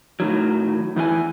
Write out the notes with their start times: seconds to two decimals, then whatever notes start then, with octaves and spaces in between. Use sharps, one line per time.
0.20 A2 D#3 F#3
0.96 E2 E3 F4 G#5